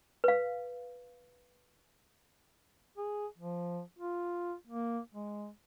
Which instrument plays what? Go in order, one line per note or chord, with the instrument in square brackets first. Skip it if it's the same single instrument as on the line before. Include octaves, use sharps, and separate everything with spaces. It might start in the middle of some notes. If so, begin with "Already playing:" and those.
[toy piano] B4 F5
[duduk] G#4
F3
F4
A#3
G#3